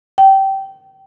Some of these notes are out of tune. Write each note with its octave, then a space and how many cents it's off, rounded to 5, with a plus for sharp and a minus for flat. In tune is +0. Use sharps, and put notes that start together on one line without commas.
G5 -20